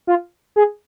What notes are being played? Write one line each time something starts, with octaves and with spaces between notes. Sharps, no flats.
F4
G#4